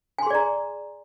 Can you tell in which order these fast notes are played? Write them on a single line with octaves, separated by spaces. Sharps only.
G#5 C6 G#4 D5 A#5